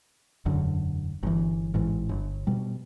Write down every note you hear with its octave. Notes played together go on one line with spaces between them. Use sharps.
E1 F#2 D3
G1 E3
A1 G#2 E3
G1
B2 G3